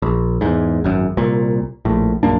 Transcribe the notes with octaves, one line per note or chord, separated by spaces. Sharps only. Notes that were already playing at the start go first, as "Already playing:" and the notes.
A#1
E2 G#2
G#1 F#2
C2 A#2
A#1 A2
A#1 F#2 A#3 D4